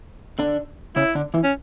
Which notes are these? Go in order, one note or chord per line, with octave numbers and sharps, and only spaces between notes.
D3 D4
C#3 C#4 E4
D3 D4
E3 E4
C#4